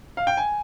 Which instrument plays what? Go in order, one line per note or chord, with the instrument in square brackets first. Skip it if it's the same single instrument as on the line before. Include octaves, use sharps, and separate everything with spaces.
[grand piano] F5
G5
G#5